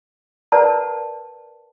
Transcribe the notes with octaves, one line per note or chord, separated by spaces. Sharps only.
A#4 B4 D5 F#5 A5 A#5